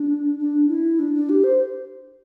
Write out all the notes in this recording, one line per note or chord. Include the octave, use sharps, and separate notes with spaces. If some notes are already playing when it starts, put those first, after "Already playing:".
Already playing: D4
D4
E4
D4
D4
G4
C5